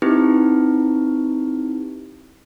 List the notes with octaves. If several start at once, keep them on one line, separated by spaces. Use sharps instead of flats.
C4 D#4 E4 G4 B4